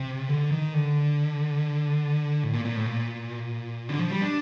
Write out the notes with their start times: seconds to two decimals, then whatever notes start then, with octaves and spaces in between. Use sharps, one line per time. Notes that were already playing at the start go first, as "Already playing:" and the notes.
Already playing: C3
0.29 D3
0.51 D#3
0.74 D3
2.43 A2
2.54 A#2
2.65 A#2
2.76 A2
2.86 A#2
3.88 D3
3.99 F3
4.11 G3
4.22 D4